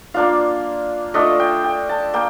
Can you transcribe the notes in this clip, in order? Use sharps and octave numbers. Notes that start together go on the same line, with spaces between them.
A#3 D4 F4 F5
A3 D4 F4 D#5
G5
G5
A5
A#3 G5